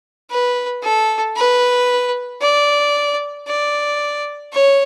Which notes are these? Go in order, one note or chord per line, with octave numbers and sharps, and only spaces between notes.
B4
A4
B4
D5
D5
C#5